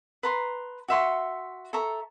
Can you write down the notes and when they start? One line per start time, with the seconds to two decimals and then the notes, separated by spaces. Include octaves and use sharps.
0.23 B4 A#5 C6
0.88 F#4 E5 C6 C#6
1.73 A4 E5 A#5 C#6